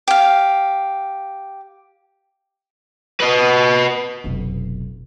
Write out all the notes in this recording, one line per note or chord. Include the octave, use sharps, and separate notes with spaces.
G4 F5
B4 D#5
F1 B1